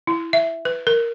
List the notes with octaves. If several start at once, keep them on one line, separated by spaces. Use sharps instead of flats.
E4
E5
B4
A#4